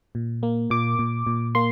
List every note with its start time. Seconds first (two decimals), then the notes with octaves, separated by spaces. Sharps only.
0.15 A#2
0.43 A#3
0.70 A#2 D6
0.99 A#2
1.27 A#2
1.55 A#3 C6